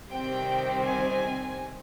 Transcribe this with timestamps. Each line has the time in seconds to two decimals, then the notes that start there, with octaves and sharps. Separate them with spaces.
0.11 C3 D#3 G3 C4 G5
0.86 G#5